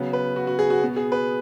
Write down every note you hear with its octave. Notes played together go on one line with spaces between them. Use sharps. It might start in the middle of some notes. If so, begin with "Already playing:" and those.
Already playing: C#3 F#3 B3
B4
F#4
F#4
G#4
F#4
B2 B3
G#4
B4